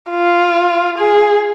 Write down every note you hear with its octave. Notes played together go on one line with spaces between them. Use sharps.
F4
G#4